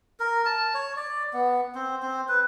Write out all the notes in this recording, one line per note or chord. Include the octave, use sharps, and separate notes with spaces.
A#4
A5
C#5
D5
B3
C4
C4
B4